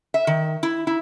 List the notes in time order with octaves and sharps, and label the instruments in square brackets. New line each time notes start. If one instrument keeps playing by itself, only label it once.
[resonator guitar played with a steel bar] E5
D#3
E4
E4